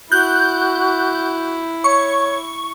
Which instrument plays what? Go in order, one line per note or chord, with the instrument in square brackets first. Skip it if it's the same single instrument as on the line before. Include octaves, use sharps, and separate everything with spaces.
[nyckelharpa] E4 [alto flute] F#4 [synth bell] F#6 G6
[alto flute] C#5 [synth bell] C#6